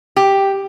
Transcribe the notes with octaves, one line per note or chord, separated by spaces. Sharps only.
G4